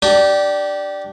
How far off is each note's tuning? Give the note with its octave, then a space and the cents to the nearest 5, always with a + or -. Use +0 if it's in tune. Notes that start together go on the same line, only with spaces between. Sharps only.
D4 +0 G4 -20